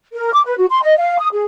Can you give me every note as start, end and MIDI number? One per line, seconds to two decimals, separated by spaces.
0.14 0.31 70
0.33 0.41 86
0.46 0.55 71
0.58 0.65 66
0.70 0.82 84
0.82 0.94 75
0.98 1.19 77
1.19 1.28 87
1.33 1.45 68